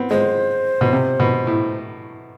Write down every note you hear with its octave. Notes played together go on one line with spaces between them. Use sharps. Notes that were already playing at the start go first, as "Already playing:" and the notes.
Already playing: B3 C4
G#3 C5
B2
C3
B2
A2